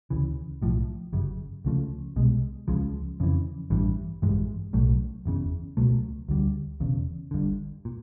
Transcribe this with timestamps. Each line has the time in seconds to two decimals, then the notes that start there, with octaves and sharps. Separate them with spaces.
0.10 D2 C#3 E3
0.61 B1 A2 F3
1.13 G1 F#2 C#3
1.65 C#2 C#3 F3 A3
2.16 C2 B2 G#3
2.68 C#2 C#3 F3 G#3
3.20 F2 C#3 E3
3.70 A1 G2 E3
4.22 A1 G2 E3 G#3
4.73 B1 A2 F#3 A3
5.25 F#1 E2 C#3
5.77 C#2 B2 F#3 A3
6.29 D2 D3 G3
6.80 E1 E2 C#3
7.31 G1 G2 D3
7.85 A#2